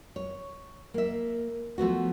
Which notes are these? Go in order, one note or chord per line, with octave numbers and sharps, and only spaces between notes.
C#5
A#3 E5
F3 A3 B3 F#4